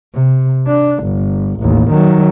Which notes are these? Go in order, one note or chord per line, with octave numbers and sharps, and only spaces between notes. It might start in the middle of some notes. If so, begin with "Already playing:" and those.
C3
D4
G1
A1 D#2
D#3 F#3